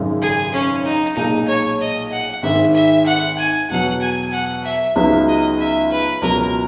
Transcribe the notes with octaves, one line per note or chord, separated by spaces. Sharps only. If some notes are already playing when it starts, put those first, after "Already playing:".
Already playing: G#1 F#2 C#3
G#4
C#4
D#4
B1 A#2 G#3 D#4
C#5
D#5
F#5
G#1 G#2 D#3 E5
E5
F#5
G#5
E2 B2 F#3 F#5
G#5
F#5
E5
C#2 C#3 F#3 B3 D#4 E5
D#5
E5
B4
C#2 B2 F#3 A#4